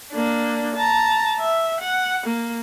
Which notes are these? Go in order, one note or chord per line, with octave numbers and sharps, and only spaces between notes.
A#3 D4
A5 A#5
E5
F#5
A#3